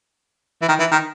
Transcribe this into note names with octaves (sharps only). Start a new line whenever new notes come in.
E3
D#3
E3
D#3